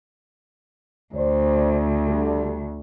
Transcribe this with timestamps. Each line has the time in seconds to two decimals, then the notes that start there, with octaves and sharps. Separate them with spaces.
1.15 D2 C5 D5
2.07 D3 G3 A3